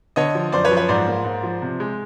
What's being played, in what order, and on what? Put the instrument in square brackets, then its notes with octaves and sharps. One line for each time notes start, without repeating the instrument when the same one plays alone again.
[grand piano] D3 C#5 D#5
F3
F#2 C5 D5
B4 C#5
F3
B4 C#5
G#2 C5 D5
A#3
G#2
F3
C3
G#3